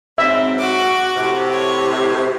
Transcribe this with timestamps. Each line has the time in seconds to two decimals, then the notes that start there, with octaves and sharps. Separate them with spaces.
0.18 G#2 F#3 C4 E5
0.59 F#4 D6
1.16 A2 C3
1.52 C#5